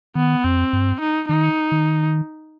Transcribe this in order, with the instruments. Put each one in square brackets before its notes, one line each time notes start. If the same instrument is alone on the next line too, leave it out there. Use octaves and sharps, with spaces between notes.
[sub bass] D#3 [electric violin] B3
[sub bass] F2 [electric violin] C4
[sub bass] G2
[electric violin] D#4
[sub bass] D#3 [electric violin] D#4
[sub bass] D#3